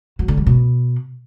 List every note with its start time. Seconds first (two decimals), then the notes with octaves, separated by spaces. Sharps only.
0.19 F#3
0.28 D3
0.37 G3
0.47 B2